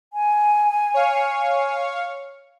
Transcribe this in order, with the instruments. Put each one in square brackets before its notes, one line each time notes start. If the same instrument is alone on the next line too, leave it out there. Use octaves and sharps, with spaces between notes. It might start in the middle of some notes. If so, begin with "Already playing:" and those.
[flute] G#5
[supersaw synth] C#5 F5 C#6